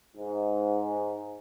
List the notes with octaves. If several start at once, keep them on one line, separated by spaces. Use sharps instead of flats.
G#2